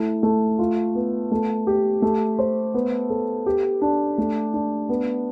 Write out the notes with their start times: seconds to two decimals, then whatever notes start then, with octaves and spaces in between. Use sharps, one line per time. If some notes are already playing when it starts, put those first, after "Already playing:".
Already playing: A3 E4
0.23 A3
0.59 F4
0.95 B3
1.32 A3
1.67 G4
2.02 A3
2.39 C5
2.74 B3
3.10 A4
3.46 G4
3.82 D4
4.18 A3
4.54 D4
4.89 B3